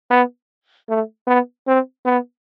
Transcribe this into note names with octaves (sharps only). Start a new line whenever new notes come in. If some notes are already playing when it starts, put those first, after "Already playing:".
B3
A3
B3
C4
B3